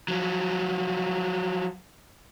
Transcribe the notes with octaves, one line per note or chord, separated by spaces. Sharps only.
F3 F#3